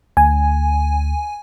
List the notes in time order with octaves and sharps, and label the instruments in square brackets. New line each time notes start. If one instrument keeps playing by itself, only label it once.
[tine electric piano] D2 [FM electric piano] G#5